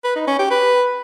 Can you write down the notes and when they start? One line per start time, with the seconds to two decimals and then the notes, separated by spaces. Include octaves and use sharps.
0.04 B4
0.16 D#4
0.27 C#4
0.39 G4
0.51 B4